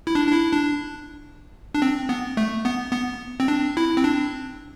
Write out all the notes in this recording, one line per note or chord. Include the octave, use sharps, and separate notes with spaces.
E4
D4
D4
E4
D4
D4
C4
B3
A3
B3
B3
C4
D4
E4
C4
D4